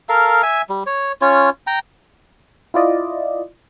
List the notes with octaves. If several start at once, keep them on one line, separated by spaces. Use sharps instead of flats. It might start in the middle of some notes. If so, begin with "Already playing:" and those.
A4 A#4 F5
E5 G#5
G3
C#5
C#4 F4 C#5
G5 A#5
E4 F4 D5 D#5